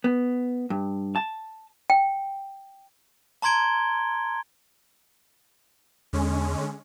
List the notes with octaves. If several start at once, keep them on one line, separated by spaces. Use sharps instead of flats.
B3
G2
A5
G5
A5 A#5 C6 G#6 D7 G7
E2 D3 G#3 C#4